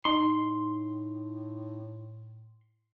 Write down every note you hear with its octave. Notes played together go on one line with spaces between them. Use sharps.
A2 D#4 C6